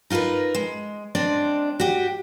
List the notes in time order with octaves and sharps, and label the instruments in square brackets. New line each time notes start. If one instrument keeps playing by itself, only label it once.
[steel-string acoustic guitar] D#4 F4 G#4 A#4 B4
G#3
G#3 C4 D4 D5
F#4 G4